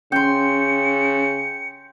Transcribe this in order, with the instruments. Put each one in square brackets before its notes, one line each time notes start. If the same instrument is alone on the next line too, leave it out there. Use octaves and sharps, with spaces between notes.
[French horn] C#3 [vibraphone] C#4 [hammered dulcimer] G5 C6 [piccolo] C#7